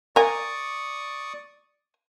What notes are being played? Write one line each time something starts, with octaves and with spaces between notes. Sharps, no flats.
A#4 D5 G#5 C#6 D#6